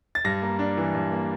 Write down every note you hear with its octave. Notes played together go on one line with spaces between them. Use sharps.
A6
G2 A#6
A#3
D4
E3
G2
A#3